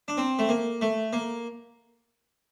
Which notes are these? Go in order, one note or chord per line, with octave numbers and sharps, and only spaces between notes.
D4
C4
A3
A#3
A3
A#3